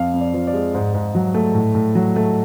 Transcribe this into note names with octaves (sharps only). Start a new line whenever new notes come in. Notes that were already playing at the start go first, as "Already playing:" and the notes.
Already playing: F2 F5
F2
D5
F3
D5
G#3
G#2
G#2
F#3
A3
A2
A2
F#3
A3